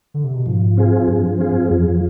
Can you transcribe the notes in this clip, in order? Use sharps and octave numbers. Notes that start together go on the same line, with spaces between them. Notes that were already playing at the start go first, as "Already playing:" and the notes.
D3
C3
B2
G#2 F3
C4 F4 G#4
G2 F3
C4 F4 G#4
F2 F3